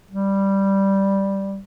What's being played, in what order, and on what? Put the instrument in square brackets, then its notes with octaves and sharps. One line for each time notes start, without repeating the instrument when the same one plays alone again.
[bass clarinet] G3